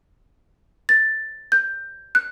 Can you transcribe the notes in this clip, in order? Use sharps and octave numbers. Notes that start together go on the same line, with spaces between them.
A6
G6
F#6